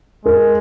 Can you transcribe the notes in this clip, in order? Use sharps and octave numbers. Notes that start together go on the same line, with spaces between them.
G#3 A#4